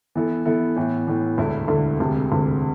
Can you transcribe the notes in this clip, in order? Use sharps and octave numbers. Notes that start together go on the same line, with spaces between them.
E3 B3 E4 A4
E3 B3 E4 A4
A2 E3 B3
A2 E3 B3
E1 D2 D3 A3 E4
E1 D2 D3 A3 E4
E1 D2 C3
E1 D2 C3